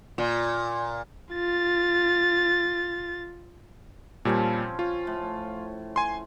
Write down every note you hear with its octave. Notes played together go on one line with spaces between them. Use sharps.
A#2
F4 A6
A#2 F3 G3 C4 C#4
F4 C#5
A2
G#5 C6